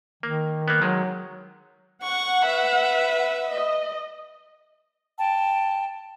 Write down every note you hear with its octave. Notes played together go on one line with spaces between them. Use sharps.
D#3 A#3
A#3 B3
D#3 F#3 G#3
F#5 C#6
B4 E5
D#5
G5 A5